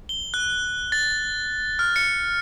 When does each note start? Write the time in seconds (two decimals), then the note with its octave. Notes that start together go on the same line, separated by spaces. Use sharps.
0.09 G7
0.34 F#6
0.92 A6
1.79 F6
1.96 C#7